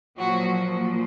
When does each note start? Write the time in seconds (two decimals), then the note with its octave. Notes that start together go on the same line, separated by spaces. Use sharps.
0.18 A#2 F3 F#3 F#4